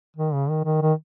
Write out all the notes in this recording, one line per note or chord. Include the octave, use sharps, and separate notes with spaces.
D#3
C#3
D#3
D#3
D#3